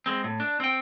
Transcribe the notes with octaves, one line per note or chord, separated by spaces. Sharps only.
G#3 C4
A2
D4
C4 G5